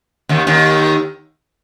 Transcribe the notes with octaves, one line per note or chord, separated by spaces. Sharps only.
D#2 D#3
D#2 D#3